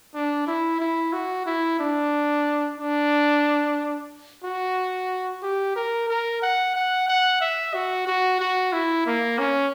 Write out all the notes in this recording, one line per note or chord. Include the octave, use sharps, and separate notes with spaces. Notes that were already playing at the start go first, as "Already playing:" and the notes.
D4
E4
E4
F#4
E4
D4
D4
F#4
G4
A#4
A#4
F#5
F#5
F#5
E5
F#4
F#4
F#4
E4
A#3
C#4